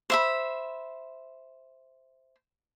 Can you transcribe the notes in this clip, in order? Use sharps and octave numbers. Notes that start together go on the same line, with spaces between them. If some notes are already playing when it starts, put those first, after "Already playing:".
C5 E5 B5